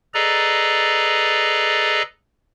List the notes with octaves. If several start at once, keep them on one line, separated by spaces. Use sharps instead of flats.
G#4 A4 B4 D5 D#5 A#5